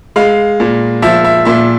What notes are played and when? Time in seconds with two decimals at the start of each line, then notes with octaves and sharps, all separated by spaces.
0.16 G#3 F5
0.60 A#2
1.02 F3 E5
1.24 E5
1.45 A#2 E5